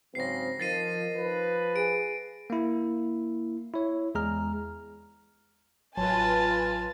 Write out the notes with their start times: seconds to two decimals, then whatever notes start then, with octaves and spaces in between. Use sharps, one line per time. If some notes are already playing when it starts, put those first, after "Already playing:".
0.15 G#2 C#3 F#3 C4 A#6 C7
0.60 D#3 F3 A6 C7 D#7
1.16 F3 B4
1.76 G#4 D7
2.50 A#3 E4
3.74 E4 C#5
4.15 E2 G#3 G#4 A#5 F6
5.97 A1 F#3 F4 B4 C#5 G#5 A5